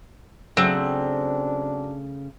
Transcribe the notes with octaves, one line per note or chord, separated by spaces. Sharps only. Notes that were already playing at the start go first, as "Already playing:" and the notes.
C#3 F#3 A3 C4 D4